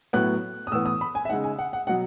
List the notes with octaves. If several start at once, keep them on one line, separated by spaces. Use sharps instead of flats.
A2 F#3 B3 E4 F#6
D#6
A2 E3 B3 E6
D#6
B5
G#5
E5
C#3 G#3 D#4 F#5
G#5
F#5
F#5
B2 F#3 F#5